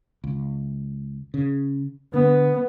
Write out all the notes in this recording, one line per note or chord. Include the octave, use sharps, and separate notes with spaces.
C#2
C#3
D3 B3